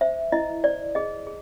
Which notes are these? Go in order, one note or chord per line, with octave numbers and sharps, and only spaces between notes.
C5 E5
E4 D#5
C5 D5
G#4 D#5
G#4